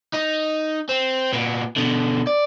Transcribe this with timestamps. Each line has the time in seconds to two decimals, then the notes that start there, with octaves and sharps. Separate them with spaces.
0.14 D#4
0.89 C4
1.33 A#2 B3
1.76 B2 D3
2.27 D5